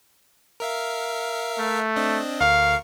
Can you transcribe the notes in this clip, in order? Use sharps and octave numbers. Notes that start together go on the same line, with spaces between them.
A#4 E5 F5
A3
C4 D4 D#5
D2 A#4 F5 C#6